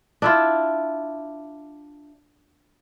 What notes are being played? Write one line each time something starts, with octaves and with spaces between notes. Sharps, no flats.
D4 E4 F4